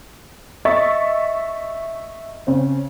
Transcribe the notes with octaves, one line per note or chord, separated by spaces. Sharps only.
D#5 E5 C#6 A6
C#3 C4